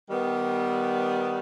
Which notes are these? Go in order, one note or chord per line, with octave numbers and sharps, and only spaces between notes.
D#3 G3 B3